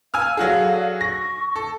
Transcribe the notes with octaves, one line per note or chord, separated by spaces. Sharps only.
F5 G#5 E6 F6
F#3 F#4 G#4 A4 D5 F5
C#6 A#6
A4